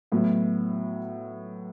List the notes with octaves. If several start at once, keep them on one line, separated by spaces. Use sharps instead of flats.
A2 F#3 B3